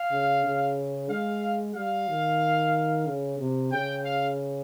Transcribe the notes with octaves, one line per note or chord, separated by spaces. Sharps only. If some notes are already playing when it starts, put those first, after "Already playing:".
Already playing: F5
C#3
C#3
G#3 F5
G3 F5
D#3
C#3
C3
C#3 G5
F5